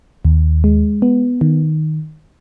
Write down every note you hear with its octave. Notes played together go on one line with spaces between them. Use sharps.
D#2
G#3
B3
D#3